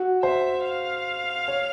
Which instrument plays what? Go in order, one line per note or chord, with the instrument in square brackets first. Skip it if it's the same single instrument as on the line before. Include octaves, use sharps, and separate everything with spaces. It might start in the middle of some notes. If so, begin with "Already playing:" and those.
Already playing: [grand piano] F#4
[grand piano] C5 [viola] E5
[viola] F5
[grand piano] C#5